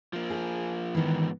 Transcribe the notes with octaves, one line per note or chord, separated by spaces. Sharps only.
F3 A#3
G#4
G#2 D#3 E3 B3